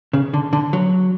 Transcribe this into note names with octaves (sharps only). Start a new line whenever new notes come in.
C#3
D3
D3
F#3